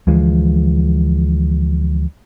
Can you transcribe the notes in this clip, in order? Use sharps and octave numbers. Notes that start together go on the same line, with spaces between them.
D2 E3 F3 G#3